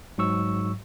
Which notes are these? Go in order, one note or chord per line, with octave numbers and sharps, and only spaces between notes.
G#2 F#3 C#6 E6